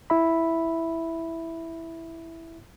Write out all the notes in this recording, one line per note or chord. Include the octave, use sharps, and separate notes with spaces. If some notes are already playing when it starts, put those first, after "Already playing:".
E4 E5 B5